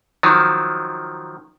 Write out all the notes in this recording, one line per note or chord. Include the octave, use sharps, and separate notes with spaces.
D#3 F3 F#3